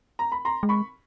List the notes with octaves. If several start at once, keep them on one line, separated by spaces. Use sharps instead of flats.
A#5
B5
A#5 C6
G#3
B5 C#6